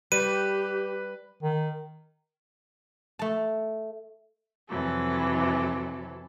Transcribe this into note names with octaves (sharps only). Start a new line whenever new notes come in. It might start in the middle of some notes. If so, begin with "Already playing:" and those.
G3 G4 B4 D#7
D#3
A3 A5
F2 C3 E3 F#3 A4